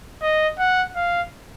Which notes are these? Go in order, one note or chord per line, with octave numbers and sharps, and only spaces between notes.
D#5
F#5
F5